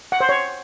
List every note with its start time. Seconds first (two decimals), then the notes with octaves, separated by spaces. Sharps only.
0.12 F#5
0.20 C5
0.29 C#5